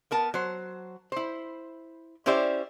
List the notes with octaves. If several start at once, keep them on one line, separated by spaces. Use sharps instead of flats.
B3 A#4 A5
F#3 C5
E4 C5
C#4 E4 G4 C5 D5 E5